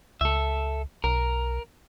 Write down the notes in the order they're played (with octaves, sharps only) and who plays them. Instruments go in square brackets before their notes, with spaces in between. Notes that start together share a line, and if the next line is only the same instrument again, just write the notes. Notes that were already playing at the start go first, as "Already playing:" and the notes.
[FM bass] C#2 [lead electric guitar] A4 E5
[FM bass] B1 [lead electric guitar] A#4